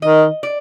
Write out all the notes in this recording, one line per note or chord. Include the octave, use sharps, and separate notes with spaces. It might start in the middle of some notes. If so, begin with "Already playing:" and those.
D#3 D#5
D5